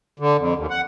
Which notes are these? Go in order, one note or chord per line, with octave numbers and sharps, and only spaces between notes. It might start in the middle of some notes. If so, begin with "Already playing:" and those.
D3
F2
D#2
F#5